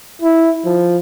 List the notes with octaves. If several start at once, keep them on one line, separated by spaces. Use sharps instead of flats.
E4
F3